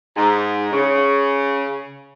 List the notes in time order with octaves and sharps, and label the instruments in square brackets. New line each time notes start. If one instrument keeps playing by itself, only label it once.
[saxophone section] G#2
C#3